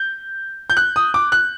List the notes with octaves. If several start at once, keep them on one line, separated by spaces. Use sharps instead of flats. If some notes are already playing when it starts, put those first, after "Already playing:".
Already playing: G6
G6
F#6
D#6
D6
F#6